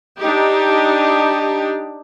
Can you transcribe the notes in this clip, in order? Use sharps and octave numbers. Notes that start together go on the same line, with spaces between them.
D4 D#4 G4